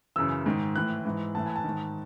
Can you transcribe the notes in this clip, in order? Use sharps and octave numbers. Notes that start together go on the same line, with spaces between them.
F#2 C#3 E3 E6
G#2 D#3
A2 E3 F#6
G#2 E3
A2 E3 A5
G#5
A5
G#2 D#3